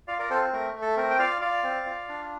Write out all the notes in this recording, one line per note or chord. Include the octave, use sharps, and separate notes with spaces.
F4 D5 F5
A#4 D5
C4 A4 C5
A3 A#4
A3
A4
C4 A#4
G5
F4 D5 F5
F4 D5 F5
C4
F4
D4